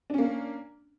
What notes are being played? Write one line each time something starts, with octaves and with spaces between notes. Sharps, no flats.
A#3 C#4 D4